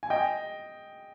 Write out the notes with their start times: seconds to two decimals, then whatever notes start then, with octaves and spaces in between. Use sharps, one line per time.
0.03 G#5
0.10 D#5 G5